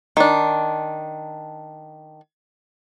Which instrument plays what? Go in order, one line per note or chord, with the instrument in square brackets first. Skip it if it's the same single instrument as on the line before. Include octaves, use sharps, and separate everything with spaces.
[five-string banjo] D#3 D4